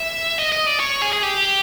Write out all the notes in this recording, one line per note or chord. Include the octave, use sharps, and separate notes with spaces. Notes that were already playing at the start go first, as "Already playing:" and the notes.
Already playing: E5
D#5
D#5
D5
C#5
G#4
G#4
G4